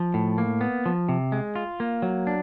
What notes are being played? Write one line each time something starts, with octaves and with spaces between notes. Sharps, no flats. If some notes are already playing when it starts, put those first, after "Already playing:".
Already playing: F3
A2
A#3
B3
F3
C3
G#3
F4
A#3
F#3
D4